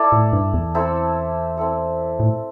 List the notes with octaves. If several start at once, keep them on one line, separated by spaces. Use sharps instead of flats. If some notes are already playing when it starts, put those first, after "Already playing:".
Already playing: E4 A4 D5
A2
G2
E2
C4 E4 A4
C4 E4 A4
A2